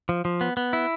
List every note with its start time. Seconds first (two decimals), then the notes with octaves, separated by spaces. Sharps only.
0.09 F3
0.25 F3
0.41 B3
0.57 B3
0.73 E4